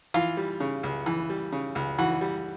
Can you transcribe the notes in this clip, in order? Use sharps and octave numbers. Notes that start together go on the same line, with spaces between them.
E3 F4 F5
G3
C#3
C#2
E3
G3
C#3
C#2
E3 F#4 F#5
G3